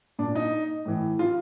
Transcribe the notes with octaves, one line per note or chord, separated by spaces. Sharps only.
A#2 D4
D#4
A2 E3
F4